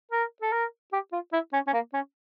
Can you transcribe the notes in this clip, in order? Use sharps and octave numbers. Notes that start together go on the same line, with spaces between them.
A#4
A4
A#4
G4
F4
E4
C#4
C#4
A#3
C#4